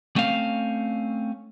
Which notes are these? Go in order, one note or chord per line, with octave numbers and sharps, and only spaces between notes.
A3 C4 C#4 F5